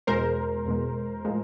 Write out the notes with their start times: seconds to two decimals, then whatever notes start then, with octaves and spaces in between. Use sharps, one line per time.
0.07 E2 B2 G#3 A#4 C5
0.66 E2 B2 G#3
1.25 A2 F3 G#3